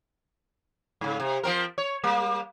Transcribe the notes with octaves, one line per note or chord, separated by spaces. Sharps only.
G#2 C#3
C3
F3 C4 A#4
C#5
G3 A#3